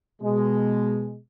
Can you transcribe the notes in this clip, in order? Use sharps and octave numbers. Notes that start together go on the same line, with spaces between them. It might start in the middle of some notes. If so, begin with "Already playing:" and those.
B2 G#3